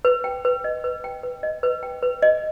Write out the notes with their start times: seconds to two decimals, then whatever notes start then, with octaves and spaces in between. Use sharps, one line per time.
0.05 B4
0.24 G5
0.45 B4
0.64 D#5
0.84 B4
1.04 G5
1.23 B4
1.43 D#5
1.63 B4
1.83 G5
2.03 B4
2.22 D#5